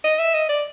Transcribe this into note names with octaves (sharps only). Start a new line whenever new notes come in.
D#5
E5
D#5
D5